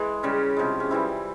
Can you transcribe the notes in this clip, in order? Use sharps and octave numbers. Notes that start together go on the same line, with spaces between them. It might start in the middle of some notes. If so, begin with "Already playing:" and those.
Already playing: E3 G#3
C#3 G3 C#4
C3 F3 G#3
C#4
C3 E3 G3 E4